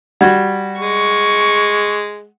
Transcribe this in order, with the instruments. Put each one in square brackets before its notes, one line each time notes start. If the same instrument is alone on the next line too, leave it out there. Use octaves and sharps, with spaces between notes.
[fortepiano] G3 F#4 [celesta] F#5 G#6
[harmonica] G#3 [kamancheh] C#6